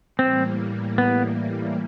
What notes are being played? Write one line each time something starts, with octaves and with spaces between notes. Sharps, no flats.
A2 E3 G3 A#3 C4
B3